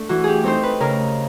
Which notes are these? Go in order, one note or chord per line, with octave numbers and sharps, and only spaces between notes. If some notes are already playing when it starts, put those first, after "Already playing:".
Already playing: A3 D4
E3 F#4
G4 G#4
A3 C4 D#4 C5
B4
C#3 A#4